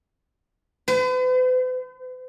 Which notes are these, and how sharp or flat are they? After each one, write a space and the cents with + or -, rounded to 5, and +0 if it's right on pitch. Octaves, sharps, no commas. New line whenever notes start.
B4 +45